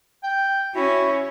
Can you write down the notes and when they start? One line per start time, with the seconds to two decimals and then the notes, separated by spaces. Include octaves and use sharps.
0.24 G5
0.75 C#4 E4 F#4 E5